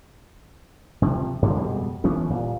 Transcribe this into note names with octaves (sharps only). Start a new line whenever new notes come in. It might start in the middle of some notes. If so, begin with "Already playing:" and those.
C3 F3
G2 D3 E3 F3
F2 B2 G3 G#3
E3 F3 B3 C#4
D#1 A#2